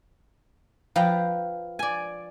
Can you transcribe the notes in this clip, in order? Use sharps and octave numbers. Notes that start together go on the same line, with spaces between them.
F3 B4 F5 G5 A#5
D5 G#5